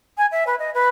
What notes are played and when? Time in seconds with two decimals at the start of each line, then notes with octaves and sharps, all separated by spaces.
0.18 G#5
0.31 E5
0.47 B4
0.59 D#5
0.74 B4